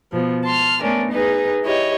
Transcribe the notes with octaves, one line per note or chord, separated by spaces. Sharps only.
B2 F3
A5 C6 F6
A3 B3 C#4 D4 A#4
D#4 G#4 B4
E4 G4 C#5 D#5